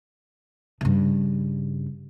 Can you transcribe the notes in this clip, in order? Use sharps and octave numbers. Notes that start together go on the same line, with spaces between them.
G2 C#3